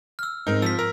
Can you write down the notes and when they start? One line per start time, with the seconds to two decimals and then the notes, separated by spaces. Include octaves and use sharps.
0.19 E6 F6
0.47 G#2 C4 D#4 A#4
0.62 F3 E6 B6
0.79 A#4 E6